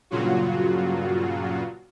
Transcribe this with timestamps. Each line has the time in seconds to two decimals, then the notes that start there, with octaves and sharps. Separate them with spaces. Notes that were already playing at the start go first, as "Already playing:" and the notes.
0.11 G2 A#2 C#3 F#3 F4 F#4